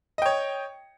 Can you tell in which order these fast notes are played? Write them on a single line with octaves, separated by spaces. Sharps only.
D#5 G5 C#5